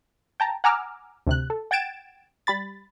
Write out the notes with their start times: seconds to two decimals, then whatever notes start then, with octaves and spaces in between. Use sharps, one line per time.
0.40 G5 A5 A#5
0.64 F#5 G#5 A#5 D6 E6 F6
1.27 D2 C3 F#6
1.50 A4
1.71 F#5 G5 G#6 A6 D7 E7
2.47 G3 B5 A6